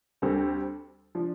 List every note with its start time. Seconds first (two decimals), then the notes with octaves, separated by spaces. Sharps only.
0.22 D2 D3 G3 C4 A4
1.15 F3 D4